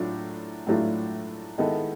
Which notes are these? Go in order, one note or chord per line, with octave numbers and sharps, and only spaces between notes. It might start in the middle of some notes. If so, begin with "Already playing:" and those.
Already playing: A2 F#3 A3 D4 F4
A2 F#3 A3 D4 F4
D#3 G#3 B3 E4 A4